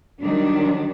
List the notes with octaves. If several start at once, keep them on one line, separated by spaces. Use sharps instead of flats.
D#3 F#3 G3 D4